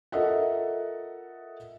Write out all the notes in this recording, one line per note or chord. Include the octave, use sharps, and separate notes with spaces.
F4 A4 A#4 D#5 E5 F#5